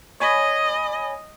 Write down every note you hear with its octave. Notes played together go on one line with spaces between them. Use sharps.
C#5 D#5 G#5 B5